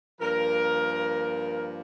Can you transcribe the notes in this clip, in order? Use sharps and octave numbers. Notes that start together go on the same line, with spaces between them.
G2 F3 A#3 A#4